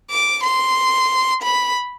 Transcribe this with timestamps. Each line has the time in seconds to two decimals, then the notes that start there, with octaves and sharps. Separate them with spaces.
0.10 D6
0.44 C6
1.43 B5